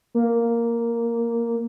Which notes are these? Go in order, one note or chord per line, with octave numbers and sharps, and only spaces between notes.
A#3